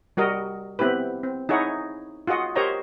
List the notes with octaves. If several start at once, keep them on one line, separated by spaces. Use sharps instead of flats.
G3 F#4 A#4 D#5
B3 C4 E4 G4 B4
C4
D#4 E4 G#4 C#5 F#5
F4 F#4 G#4 D#5 F#5
G4 A#4 C5 C#5 D#5 A#5